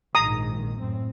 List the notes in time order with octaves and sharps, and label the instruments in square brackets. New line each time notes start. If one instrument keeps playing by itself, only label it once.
[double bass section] A#1 G#2 D#3 [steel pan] A#5 D#6
[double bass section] F#2 A2 C4